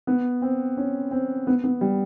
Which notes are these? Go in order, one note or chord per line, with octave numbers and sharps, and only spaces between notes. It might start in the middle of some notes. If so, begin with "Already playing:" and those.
B3
C4
C#4
C4
B3
B3
G3